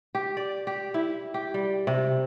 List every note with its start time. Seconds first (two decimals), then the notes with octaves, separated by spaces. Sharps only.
0.15 G4
0.37 D5
0.67 G4
0.94 E4
1.34 G4
1.54 G3
1.87 C3